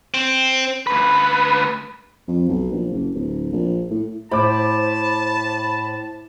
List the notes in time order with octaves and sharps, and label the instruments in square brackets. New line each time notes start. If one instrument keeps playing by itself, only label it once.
[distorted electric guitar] C4
[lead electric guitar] D2 B4
[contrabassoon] F2
B1
A#1
F#1
D1
A#1
A2
[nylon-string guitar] A2 [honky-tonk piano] C5 D6 [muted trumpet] A5 [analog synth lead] B5